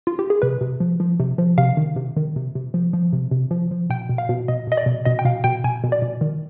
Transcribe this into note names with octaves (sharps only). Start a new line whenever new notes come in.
F4
G4
G#4
C3 B4
C3
F3
F3
C3
F3
C3 F5
D#3
C3
D#3
C3
C3
F3
F3
C3
C3
F3
F3
B2 G5
B2
F5
B2
B2 D#5
B2 D#5
D5
B2
B2 D#5
G5
B2 F5
B2 G5
B2 G#5
B2
D5
B2
D#3